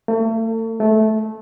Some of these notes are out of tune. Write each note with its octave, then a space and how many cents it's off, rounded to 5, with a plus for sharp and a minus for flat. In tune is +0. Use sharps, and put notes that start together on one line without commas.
A3 +40
A3 -15